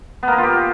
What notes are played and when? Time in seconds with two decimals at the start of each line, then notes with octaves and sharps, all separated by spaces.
0.23 B3
0.28 A#3
0.33 A#4
0.38 F4
0.43 G4